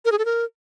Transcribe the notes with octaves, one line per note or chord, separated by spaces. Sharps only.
A#4
G#4
A4
A#4